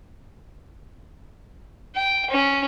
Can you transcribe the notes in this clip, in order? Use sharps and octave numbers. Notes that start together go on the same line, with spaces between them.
G5
C#4